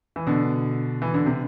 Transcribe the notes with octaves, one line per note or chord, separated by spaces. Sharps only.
E3
B2 D3
E3
D3
C3